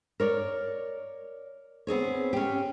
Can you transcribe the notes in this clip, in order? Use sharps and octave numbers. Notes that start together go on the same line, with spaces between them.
A#4 C#5 D5
B3 C4 G#4 C#5
C#4 G4